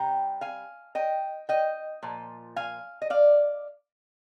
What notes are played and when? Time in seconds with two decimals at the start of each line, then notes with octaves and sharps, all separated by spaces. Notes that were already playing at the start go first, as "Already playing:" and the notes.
Already playing: C3 G3 C4 G5 A#5
0.41 F5 G#5
0.95 D#5 G5
1.49 D#5 G5
2.03 A#2 F3
2.56 F5 G#5
3.02 D#5
3.10 D5 F5